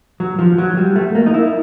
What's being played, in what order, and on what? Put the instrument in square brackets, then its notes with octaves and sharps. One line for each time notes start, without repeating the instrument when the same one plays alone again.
[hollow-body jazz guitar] F#3
F3
F#3
G3
A3
A#3
D#4
E4